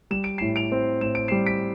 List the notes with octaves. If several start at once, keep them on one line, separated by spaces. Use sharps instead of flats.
G3 E7
D7
C7 E7
A2
D7 F7
C4
A2 E7
D7
C7 E7
G3
B6 D7